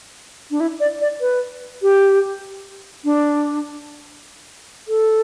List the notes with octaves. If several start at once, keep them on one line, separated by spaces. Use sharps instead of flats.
D4
E4
D5
D5
B4
G4
D4
A4